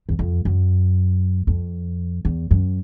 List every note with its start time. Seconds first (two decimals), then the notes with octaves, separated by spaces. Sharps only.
0.09 E2
0.19 F2
0.45 F#2
1.47 F2
2.25 E2
2.51 F#2